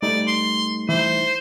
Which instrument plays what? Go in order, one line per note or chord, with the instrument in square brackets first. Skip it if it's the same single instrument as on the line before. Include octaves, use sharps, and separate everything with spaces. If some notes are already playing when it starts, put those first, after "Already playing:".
[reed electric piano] G3 A3 D#4 [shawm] D5
[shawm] C6
[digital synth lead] E3 [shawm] C5